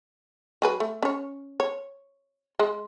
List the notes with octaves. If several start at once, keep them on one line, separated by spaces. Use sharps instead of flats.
F#3 G#4 B4
A3
C#4 C#5
C#5
G#3